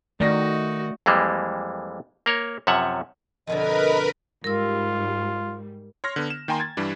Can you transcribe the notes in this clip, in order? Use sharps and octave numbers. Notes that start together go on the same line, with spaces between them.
D#3 A3 D#4 F#4 D5 A#6
F2 E3 G3 G#3 A#3
A#3 A#4 C#5
F#2 C3 F3 C#5 E5 F#5
F2 B2 D3 A#4 B4 D#5 B5
G#2 G3 F4 A#4 E6
C#5 C6 F6 A#6
D3 B3
E7
D#3 A#3 G5 G#5 A#5 C6
G#6 A6
G2 E3 G3 D4